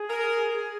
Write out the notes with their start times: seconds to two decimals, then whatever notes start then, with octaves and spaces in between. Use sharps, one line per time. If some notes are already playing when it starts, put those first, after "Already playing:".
Already playing: G#4
0.10 A#4